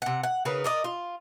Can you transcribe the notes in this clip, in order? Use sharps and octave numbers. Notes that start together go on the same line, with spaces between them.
C3 F#5
F#5
C#3 D#4 A#4 B4
A#4 D5 D#5
F4